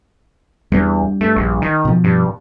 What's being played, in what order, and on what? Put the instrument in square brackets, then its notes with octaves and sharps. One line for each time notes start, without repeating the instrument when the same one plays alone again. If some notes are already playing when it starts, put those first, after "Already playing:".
[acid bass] E2 [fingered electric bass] G3 A#3 D4
[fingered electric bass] G2 [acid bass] A3
[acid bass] A#1
D#3
[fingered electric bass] B2 F3
[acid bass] G2